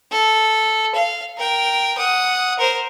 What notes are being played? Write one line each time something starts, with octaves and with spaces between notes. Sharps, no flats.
A4
F5
A#4 G5
F#5 D#6
A#4 C5